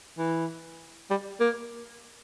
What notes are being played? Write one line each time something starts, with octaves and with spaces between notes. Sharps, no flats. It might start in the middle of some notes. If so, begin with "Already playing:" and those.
E3
G3
A#3